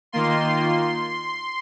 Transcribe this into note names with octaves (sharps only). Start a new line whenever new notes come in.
D#3 A#3 F4 C6